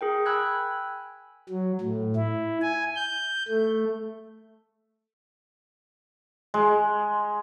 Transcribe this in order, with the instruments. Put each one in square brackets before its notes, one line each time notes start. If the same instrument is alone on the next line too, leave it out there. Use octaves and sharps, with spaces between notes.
[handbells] G#4 A#4 G5
G5 G#5 B5 E6 F#6 G#6
[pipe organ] F#3
A2
E4
G#5
G6
A3
[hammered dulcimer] G#3